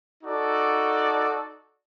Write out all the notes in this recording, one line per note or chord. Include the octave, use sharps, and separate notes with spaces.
D#4 F#4 A4 D5